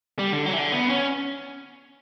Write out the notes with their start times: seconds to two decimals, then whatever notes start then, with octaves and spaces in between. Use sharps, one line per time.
0.19 G3
0.32 D3
0.46 F#3
0.53 E3
0.58 D3
0.72 B3
0.90 C#4